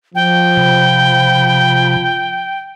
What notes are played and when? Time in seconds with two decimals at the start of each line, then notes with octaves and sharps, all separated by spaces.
0.15 F3 G5
0.57 C3 B5